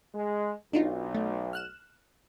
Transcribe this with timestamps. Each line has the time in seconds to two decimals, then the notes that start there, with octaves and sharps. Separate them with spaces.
0.14 G#3
0.73 B1 D4 D#4 F4
1.15 A3
1.53 F6 F#6 E7